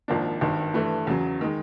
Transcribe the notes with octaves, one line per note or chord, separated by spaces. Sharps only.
G#1 G#2 F3 A#3 D4
G#1 G2 D#3
G2 E3 A3
E2 C#3 F#3
D#3 G#3